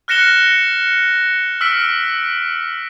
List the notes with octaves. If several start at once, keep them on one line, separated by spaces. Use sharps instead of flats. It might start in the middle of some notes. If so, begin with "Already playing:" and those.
F6 F#6 A#6 C#7 E7 G7
E6 F6 B6 D7